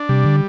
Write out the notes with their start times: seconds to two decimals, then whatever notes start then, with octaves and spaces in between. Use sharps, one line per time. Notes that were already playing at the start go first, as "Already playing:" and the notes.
Already playing: D4
0.09 C3 G3
0.25 D3